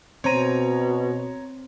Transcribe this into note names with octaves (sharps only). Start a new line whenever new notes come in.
B2 C4 C#5 A#5 D#7